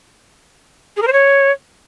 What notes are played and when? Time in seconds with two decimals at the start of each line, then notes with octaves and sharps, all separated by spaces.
0.97 G#4
1.02 A#4
1.07 C5
1.13 C#5